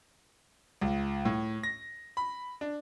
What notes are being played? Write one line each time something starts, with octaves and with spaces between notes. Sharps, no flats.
C#2
A2
A#6
B5
D4